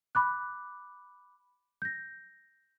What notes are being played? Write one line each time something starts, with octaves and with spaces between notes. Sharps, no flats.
B5 D6 F#6
G6 A#6